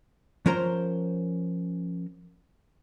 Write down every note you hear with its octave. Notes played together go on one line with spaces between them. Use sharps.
F3 C#4 A#4 C5 A#5